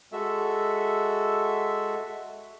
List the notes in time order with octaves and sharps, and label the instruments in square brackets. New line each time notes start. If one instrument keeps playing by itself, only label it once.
[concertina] G#3 F#4 A4 E5 E6